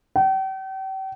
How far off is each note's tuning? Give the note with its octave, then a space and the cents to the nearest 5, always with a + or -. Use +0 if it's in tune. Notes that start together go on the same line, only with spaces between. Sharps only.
G5 -40